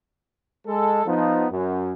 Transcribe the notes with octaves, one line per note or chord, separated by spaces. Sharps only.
G#3 A4
F3 B3 D#4
F#2